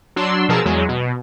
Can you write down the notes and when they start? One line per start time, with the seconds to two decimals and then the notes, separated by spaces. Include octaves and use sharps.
0.16 F#3 D4 C6 E6
0.49 B2 F3 G#4 A#4 A5 E6
0.65 E2 F#3 G#3
0.89 B2